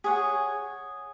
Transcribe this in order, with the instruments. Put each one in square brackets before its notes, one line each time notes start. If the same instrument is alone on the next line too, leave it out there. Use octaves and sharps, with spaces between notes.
[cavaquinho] G#4 C#5 F#5